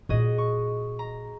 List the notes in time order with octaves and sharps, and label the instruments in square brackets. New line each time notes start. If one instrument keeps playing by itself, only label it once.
[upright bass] A#2 D#4 [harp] F#4 G#4 D#5
[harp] C#6
A#5